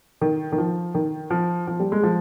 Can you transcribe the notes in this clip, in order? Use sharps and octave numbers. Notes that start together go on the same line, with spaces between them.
D#3
D#3
F3
D#3
F3
F3
G3
G#3
F3